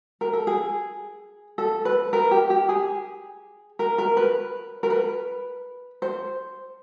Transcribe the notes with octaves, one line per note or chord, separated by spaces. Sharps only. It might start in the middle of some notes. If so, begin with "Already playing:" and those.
A#4
A4
G#4
A4
B4
A#4
G4
G4
G#4
A#4
A#4
B4
A#4
B4
C5